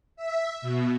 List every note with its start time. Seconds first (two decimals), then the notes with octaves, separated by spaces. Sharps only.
0.16 E5
0.62 B2